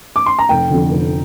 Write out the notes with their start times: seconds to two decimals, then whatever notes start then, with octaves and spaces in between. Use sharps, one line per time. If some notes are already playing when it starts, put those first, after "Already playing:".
0.16 D6
0.26 C6
0.39 A#5
0.49 F1 G5
0.70 F2 D3
0.91 F1